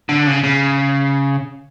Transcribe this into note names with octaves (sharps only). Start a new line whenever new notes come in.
D3
C#3
C#3